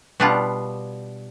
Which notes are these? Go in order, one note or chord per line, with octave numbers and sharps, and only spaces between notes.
B2 G3 B3 D4 F4